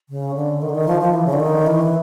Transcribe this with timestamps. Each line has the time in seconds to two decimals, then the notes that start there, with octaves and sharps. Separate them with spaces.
0.09 C#3
0.35 D3
0.62 D#3
0.69 D3
0.75 D#3
0.88 F3
1.01 F3
1.14 E3
1.26 C#3
1.33 D3
1.40 D#3
1.67 E3